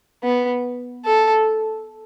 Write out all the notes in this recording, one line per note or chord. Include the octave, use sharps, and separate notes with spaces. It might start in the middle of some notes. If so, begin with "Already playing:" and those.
B3
A4